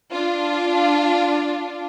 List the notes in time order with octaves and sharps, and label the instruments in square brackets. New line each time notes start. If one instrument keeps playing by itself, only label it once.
[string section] D4 F4